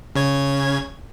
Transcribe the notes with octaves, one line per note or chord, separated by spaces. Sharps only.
C#3 C#5 G#6